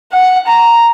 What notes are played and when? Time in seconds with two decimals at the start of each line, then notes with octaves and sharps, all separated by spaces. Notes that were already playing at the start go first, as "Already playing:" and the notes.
0.13 F#5
0.47 A#5